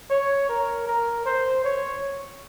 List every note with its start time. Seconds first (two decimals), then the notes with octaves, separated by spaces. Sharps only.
0.10 C#5
0.49 A#4
0.87 A#4
1.26 C5
1.64 C#5